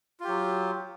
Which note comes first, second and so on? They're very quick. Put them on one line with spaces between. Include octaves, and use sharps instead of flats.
F4 G4 F#3